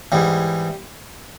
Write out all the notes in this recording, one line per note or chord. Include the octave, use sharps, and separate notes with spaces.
G#2 E3 G3